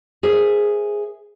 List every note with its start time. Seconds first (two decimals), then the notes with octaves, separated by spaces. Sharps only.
0.23 G#4 A#4 C5 E5